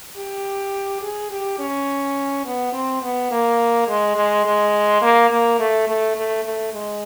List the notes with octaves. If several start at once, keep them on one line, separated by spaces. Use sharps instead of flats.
G4
G#4
G4
C#4
B3
C4
B3
A#3
G#3
G#3
G#3
A#3
A#3
A3
A3
A3
A3
G#3